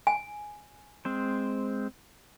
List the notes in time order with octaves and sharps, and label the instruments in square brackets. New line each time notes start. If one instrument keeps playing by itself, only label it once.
[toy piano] G#5
[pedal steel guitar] G#3 C4 C5